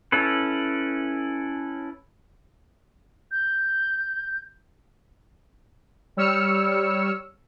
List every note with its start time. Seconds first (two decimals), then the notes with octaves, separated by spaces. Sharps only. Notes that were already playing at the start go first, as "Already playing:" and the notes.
0.12 C#4 E4 A4 B4
3.31 G6
6.17 G3 C#5 E6 F6 C#7